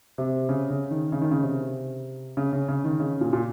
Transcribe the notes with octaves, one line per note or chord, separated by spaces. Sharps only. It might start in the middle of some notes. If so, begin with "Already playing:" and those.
C3
C#3
C#3
D#3
C#3
D#3
C#3
C3
C#3
C#3
C#3
D#3
C#3
A#2
A#2